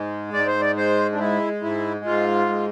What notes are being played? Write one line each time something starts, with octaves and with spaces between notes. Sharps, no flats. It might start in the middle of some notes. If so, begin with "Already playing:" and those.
Already playing: G#2 G#3
G#2 D5
C5
D5
G#3 C5
D4
G#3 E4
G#2 E4
G#2 F4
G#3